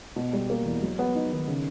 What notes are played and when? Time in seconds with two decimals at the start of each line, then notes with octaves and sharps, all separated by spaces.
0.16 B2
0.33 G3
0.50 A#3
0.66 E2
0.83 F#3
0.99 B3
1.15 D#4
1.32 D#3
1.48 C#3